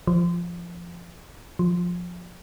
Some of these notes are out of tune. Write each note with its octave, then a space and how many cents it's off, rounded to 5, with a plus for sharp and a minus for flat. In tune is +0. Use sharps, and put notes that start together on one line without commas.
F3 -15
F3 +15